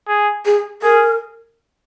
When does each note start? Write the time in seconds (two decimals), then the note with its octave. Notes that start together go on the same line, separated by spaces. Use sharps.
0.08 G#4
0.46 G#4
0.82 G#4 A#4